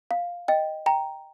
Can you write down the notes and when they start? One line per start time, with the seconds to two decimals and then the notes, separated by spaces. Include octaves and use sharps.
0.11 F5
0.48 D#5 G5
0.86 G5 A#5